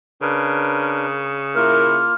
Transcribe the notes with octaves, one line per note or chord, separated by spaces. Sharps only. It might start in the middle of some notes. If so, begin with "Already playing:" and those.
C#3 D4 A#4 B4
A#3 E4 F4 A#4 F6